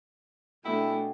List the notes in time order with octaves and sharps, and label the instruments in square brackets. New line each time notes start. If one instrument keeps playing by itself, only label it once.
[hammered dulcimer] B2 G#4 G5 [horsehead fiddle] A3 D4 [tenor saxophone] E4